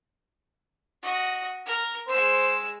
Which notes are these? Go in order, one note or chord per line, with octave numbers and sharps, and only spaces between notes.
F#4 D#5
A#4
G#3 C5 E6